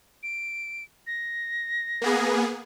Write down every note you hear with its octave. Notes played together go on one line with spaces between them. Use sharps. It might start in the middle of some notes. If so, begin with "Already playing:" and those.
D7
A#6
A#3 B3 G#4